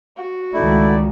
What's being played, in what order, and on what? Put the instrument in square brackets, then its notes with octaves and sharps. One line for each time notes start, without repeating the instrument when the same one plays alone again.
[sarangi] F#4
[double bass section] C#2 D#3 [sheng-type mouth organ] A3 E4 [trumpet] D5